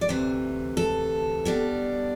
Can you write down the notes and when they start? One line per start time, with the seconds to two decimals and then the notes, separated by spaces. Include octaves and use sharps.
0.01 D5
0.08 D2 C3 E3 C5
0.77 A4
1.45 B2 G3 D4